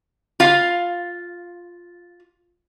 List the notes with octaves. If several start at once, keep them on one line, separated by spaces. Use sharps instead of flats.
F4 F5